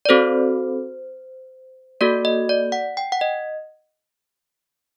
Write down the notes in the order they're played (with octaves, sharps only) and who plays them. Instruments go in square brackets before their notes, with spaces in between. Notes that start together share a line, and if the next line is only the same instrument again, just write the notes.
[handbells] D5
C4 F#4 A4 C5
A#3 F#4 A4 D5
D#5
D5
F#5
G5
F#5
D#5